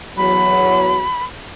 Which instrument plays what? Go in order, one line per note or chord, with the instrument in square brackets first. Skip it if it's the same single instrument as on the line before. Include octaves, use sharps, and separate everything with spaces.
[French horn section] E2 F#3 [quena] B5